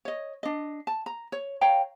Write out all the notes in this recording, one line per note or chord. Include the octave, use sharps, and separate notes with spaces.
C#5 D#5
D4 D#5
A5
A#5
C#5
C#5 F5 G5 A#5